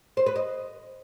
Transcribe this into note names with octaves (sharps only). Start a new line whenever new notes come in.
C5
B4
D#5